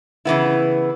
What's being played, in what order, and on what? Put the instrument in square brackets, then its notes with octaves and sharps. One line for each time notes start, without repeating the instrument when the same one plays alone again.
[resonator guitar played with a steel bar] C#3 E3 B3 E4